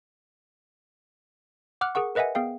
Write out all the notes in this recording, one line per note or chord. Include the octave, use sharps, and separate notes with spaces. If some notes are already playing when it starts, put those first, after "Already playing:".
F#5 D6 F6 F#6
G#4 A#4 F#5 C#6
A#4 B4 D#5 E5 F#5 G#5
B3 G#4 F5 G5